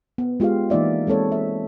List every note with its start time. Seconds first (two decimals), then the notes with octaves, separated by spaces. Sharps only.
0.18 B3
0.40 G#3 F4 G4 G#4 F5
0.70 E3 A#3 D#4 D5 E5
1.07 G#3 C4 A4 C#5
1.32 E5